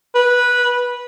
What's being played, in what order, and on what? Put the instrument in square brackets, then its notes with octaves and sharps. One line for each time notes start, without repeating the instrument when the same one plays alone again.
[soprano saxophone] B4